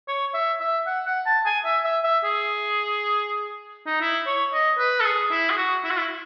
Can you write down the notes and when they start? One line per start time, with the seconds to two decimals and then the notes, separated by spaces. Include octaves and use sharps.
0.08 C#5
0.34 E5
0.60 E5
0.86 F#5
1.06 F#5
1.26 A5
1.45 G#5
1.65 E5
1.84 E5
2.04 E5
2.24 G#4
3.86 D#4
4.01 E4
4.27 C#5
4.53 D#5
4.79 B4
5.00 A4
5.05 G#4
5.31 E4
5.50 G#4
5.57 F#4
5.84 E4
5.90 F#4
5.97 E4